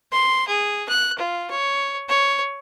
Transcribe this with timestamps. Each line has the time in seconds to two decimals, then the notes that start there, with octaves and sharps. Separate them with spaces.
0.12 C6
0.48 G#4
0.89 F#6
1.18 F4
1.51 C#5
2.09 C#5